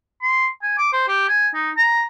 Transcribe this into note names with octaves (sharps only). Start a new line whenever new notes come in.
C6
G#5
D6
C5
G4
G#5
D#4
A#5